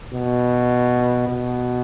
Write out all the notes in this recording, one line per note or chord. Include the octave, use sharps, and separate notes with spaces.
B2
B2